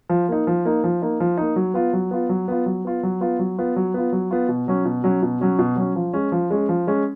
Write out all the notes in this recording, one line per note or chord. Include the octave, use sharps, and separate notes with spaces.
F3
A#3 D#4
F3
A#3 D#4
F3
A#3 D#4
F3
A#3 D#4
F#3
B3 F4
F#3
B3 F4
F#3
B3 F4
F#3
B3 F4
F#3
B3 F4
F#3
B3 F4
F#3
B3 F4
F#3
B3 F4
B2
F#3 C#4
B2
F#3 C#4
B2
F#3 C#4
B2
F#3 C#4
F3
G#3 C#4
F3
G#3 C#4
F3
G#3 C#4